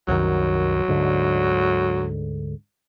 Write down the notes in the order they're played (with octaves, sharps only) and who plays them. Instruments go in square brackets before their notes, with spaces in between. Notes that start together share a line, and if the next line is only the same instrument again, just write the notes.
[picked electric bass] C2 F#2 D#3 [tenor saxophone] F#3
[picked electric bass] D2 G#2 D3